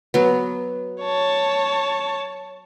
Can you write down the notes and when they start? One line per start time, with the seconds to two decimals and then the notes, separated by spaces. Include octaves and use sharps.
0.14 F#3 B3
1.02 C#5 A5